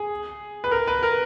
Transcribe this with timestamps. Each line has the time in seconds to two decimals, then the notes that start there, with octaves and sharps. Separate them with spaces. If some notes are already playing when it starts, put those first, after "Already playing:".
Already playing: G#4
0.64 B4
0.71 A#4
0.87 B4
1.03 A#4